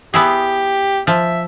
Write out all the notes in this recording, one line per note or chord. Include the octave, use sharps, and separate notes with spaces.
B3 E4 G4 G#4
F3 E5